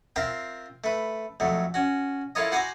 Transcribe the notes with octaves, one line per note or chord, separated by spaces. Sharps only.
C4 F4 A#4 E5 G5
A3 B4
F2 F#3 A3
C#4 F#4
E4 F4 A4 A#4 C#5 D#5
F#4 C5 F#5 G#5 A#5 D6